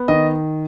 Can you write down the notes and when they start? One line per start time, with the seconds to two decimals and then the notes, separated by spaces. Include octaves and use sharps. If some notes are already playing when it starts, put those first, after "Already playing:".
Already playing: B3
0.08 D#3 D#5